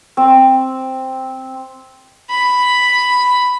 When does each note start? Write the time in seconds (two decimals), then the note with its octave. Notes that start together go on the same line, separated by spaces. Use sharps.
0.17 C4
2.30 B5